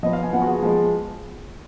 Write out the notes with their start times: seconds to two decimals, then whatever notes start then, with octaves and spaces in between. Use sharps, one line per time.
0.03 F3 B3 D#5
0.13 F5
0.23 G#5
0.33 F3 B3 F#5
0.42 F#4
0.47 G#4
0.62 F3 G#3 B3